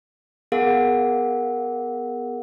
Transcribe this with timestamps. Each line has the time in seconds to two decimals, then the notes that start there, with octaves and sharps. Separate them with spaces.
0.52 B3 G#4 A#4 F5 F#5